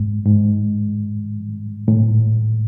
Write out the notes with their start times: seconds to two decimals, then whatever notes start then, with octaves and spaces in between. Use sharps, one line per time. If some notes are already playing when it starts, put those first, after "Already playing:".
Already playing: G#2
0.25 G#2
1.88 A2